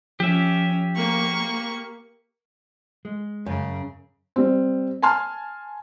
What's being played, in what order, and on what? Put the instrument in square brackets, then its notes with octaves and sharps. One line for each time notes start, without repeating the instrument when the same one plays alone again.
[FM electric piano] F3 [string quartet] C#4 [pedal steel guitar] G4 E5
[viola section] A#3 [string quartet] C#6
[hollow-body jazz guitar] G#3
[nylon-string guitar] F#2 [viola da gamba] C#3
[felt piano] G3 C4
G#5 A5 C6 F6